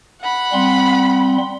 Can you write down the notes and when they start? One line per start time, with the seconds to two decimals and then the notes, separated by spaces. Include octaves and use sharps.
0.21 F#5 B5
0.53 G3 C4 C6